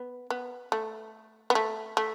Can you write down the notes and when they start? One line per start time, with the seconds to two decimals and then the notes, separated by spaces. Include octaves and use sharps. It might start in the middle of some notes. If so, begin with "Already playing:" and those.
Already playing: B3
0.30 B3
0.72 A3
1.50 B3
1.55 A3
1.97 A3